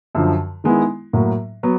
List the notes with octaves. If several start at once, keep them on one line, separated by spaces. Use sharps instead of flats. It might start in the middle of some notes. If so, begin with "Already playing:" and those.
F#2 D3 F3
D#3 G#3 B3 E4
A2 F#3 A#3
F#3 B3